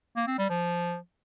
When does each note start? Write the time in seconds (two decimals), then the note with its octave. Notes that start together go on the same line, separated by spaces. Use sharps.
0.16 A#3
0.27 C4
0.39 G3
0.50 F3